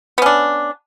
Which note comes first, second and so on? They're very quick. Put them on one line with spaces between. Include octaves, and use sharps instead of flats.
B3 C#4 D4